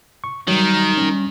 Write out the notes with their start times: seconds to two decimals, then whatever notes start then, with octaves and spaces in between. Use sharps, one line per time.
0.24 C#6
0.48 D#3 F#3 G3
0.98 G3 C#4